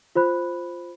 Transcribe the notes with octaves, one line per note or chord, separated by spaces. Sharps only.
F4 C5 B5 F#6